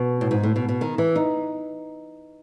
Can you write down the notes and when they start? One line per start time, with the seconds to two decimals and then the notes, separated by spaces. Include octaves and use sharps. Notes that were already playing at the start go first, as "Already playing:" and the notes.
Already playing: B2
0.21 A2
0.31 G#2
0.43 A2
0.56 B2
0.69 B2
0.81 D#3
0.98 E3
1.16 D#4